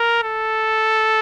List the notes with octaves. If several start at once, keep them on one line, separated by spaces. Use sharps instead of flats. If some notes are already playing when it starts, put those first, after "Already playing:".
Already playing: A#4
A4